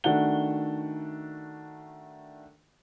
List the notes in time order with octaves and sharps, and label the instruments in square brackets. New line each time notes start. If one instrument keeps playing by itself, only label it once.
[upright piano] D#3 A3 D4 F#4 F#5 G7